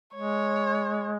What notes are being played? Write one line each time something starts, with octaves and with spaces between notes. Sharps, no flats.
G#3 C#5